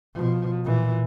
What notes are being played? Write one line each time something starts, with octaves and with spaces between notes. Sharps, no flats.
B2 F3
A#2 E3